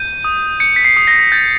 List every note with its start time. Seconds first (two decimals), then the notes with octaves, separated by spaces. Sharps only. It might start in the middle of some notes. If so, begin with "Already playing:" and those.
Already playing: G6 D#7
0.24 D#6
0.60 G6 C#7
0.76 B6
0.85 C7
0.97 D#6
1.08 A#6
1.32 G6 A6